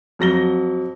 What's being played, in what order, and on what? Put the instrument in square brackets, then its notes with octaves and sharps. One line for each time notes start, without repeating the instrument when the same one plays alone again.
[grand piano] F2 F#3 A#6 G7